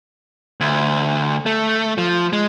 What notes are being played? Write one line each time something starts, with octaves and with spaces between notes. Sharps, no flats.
D2
A3
F3
G#3